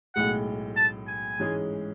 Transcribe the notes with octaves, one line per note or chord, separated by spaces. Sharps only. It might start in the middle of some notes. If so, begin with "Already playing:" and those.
B1 A2 G#3 F#5
A5
G#5
G#2 E3 G#3 C#4 G#4